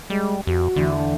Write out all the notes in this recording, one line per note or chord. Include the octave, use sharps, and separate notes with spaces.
G3 G#3
F2 F#4
E2 D3 A3 D4